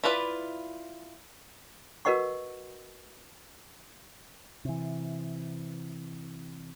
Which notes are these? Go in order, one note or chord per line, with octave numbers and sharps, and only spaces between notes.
E4 F4 B4 D5
F#4 A#4 B4 D#5 F#5 C#6
C3 E3